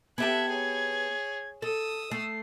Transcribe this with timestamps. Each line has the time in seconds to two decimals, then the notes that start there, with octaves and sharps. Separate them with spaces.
0.18 B3 G4 A4 E5 F#6 G#6
0.49 G#4 C#5
1.62 A4 D#6 E6
2.11 A3 C7